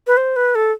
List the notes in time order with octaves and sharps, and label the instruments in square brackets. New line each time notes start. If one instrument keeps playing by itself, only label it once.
[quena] B4
C5
B4
A4